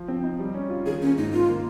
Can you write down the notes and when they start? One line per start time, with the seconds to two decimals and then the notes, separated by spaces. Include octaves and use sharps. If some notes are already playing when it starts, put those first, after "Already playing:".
Already playing: F3
0.08 C4
0.24 D#4
0.39 G3
0.54 C#4
0.70 F4
0.86 D#3 G#4
1.01 A#3 C#4
1.16 G#2 D#4
1.32 D#3 F4
1.49 A#3